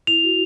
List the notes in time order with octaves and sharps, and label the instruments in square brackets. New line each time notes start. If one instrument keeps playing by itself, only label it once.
[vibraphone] E4 [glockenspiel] F7
[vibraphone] F#4